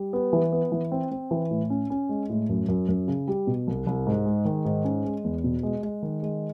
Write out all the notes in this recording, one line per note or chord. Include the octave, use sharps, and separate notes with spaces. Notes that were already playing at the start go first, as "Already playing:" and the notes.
Already playing: G3
B3
E3
B3
E3
C4
C4
E3
A2
C#4
C#4
G#3
A2
F#2
F#2
F#2
C#3
G3
B2
C2
C2
G#2
G#3
D#3
G#2
C#4
G#3
E2
B2
G#3
G#3
D#3
G#3